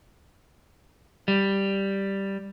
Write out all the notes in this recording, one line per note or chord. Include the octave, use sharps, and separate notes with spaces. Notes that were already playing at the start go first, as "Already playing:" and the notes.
G3